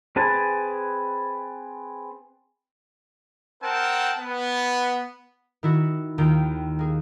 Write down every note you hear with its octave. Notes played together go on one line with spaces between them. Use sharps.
C4 G#4 B4 G#5 A5
C4 A#4 F#5 G5 A5
B3
D#3 E4 F#4
D#2 D#3 F4 G5
A#3 G#4